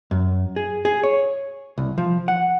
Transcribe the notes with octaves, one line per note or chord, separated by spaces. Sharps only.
F#2
G#4
G#4
C#5
C2
F3
F#5